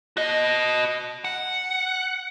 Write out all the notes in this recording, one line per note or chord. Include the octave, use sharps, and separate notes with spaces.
F#4 D#5
F#5